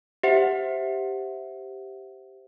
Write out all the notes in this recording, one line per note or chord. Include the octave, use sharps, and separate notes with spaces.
G4 C5 E5 F#5